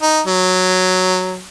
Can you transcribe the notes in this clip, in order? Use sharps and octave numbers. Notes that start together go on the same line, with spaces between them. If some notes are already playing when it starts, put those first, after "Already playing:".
D#4
F#3